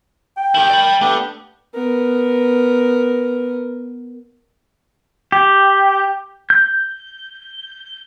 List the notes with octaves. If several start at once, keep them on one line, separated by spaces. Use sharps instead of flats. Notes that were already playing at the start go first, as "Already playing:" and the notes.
G5
D#3 E4 G4 G6
D5 B5
A3 B3 D4 G4
B3 A#4
G4
G6